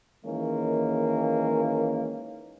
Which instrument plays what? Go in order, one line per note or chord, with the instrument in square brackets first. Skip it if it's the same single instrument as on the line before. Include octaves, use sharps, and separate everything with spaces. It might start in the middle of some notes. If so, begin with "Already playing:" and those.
[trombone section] D#3 E3 G#3 A#3 C#4